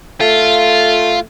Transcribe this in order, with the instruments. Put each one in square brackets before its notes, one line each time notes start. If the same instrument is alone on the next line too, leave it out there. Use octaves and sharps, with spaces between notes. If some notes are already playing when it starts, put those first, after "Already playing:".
[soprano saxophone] A3 [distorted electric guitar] F4